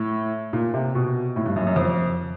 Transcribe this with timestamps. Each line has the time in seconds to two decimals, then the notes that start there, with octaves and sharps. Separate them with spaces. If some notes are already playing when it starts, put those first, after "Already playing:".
Already playing: A2
0.53 A#2
0.74 C3
0.95 B2
1.36 A2
1.46 G2
1.56 F#2
1.67 F#2
1.76 F2